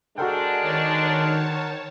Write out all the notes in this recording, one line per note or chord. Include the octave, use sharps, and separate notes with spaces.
G#3 D4 F#4 A4 A#4 C5 F#5 G5
D#3 C#5 A5